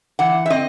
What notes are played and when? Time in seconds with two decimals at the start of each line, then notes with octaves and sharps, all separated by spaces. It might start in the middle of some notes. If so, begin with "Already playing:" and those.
0.19 E3 F#5
0.46 E5
0.50 C4 D#5